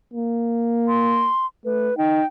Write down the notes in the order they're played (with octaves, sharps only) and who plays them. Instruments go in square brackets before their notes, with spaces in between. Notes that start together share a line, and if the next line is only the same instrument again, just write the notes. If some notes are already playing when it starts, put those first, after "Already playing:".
[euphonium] A#3
[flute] C6
[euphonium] A3 [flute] B4
[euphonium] D#4 [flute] G5